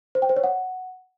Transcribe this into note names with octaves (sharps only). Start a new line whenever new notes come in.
C5
G5
C5
C#5
F#5